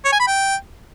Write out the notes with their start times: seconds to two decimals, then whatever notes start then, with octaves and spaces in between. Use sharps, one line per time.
0.05 C#5
0.12 G#5
0.20 B5
0.27 G5